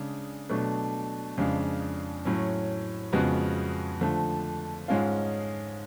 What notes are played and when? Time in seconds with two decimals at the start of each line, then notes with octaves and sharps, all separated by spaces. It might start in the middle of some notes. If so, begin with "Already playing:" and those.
Already playing: C#3 G#3 D4
0.49 B2 F#3 A3 D4
1.37 F2 C#3 G#3 D4 F4
2.25 A2 F#3 C#4
3.13 F2 C#3 G#3 B3 F#4
4.01 D3 F3 A3
4.88 G#2 G#3 C#4 F4